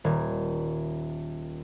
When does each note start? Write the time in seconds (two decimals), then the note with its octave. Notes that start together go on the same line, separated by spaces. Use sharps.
0.04 D#1 G#6